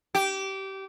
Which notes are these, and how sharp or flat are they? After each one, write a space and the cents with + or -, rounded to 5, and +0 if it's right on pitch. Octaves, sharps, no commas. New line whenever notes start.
G4 -20